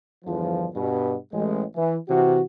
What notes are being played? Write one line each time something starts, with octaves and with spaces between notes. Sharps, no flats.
G1 E2 F3
G2 B2
A1 G#3
E3
C3 E3 F#4